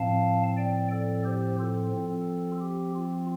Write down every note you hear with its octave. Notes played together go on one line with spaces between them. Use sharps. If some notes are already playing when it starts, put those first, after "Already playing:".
Already playing: A2 F3 C4 F5 A5
D5 G5
A4 D5
G4 C5
F4 A4
F3 C4
G4
F4